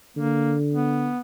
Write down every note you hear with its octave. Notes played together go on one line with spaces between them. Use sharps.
D3 A#3
B3